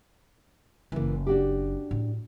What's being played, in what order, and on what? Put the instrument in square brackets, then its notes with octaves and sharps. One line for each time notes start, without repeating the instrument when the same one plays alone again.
[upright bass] F#1 C#4 [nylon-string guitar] E3 A#3
[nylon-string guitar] D4 F#4 G4
[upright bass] A2